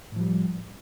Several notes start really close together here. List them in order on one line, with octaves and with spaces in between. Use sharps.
A2 F3 G3